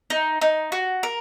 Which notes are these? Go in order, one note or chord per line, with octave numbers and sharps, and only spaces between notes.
D#4
D#4
F#4
A#4